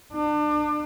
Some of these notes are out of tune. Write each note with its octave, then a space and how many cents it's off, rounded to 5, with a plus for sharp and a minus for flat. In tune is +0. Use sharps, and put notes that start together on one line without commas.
D4 +30